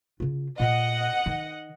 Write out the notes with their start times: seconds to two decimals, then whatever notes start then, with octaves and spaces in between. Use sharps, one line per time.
0.20 C#3 F4
0.60 A#2 D#5 F#5
1.26 D#3